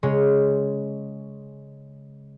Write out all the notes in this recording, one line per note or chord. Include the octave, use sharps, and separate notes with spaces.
C#3 G#3 C#5 C6